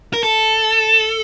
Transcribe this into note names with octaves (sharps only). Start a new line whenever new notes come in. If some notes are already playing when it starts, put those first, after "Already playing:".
A#4
A4